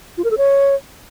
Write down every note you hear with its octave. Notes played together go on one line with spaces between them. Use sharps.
F4
A#4
A4
C#5